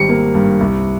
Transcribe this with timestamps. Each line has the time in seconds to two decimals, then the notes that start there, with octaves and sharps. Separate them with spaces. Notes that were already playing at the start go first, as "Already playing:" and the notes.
Already playing: G#1 G3 C#7
0.09 A#3
0.35 G2
0.61 C2